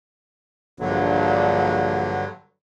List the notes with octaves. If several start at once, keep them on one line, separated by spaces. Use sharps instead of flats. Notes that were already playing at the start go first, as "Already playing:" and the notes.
A#1 G2 D3 F#3